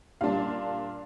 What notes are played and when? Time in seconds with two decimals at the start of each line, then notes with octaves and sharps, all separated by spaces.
0.21 A#2 G3 D4 F5